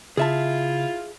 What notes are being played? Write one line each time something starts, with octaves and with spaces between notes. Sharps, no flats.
C#3 E4 F4 G#4 E5 A5